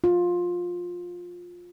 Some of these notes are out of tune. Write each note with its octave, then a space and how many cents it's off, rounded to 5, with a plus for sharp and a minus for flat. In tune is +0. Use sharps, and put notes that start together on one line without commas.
F4 +15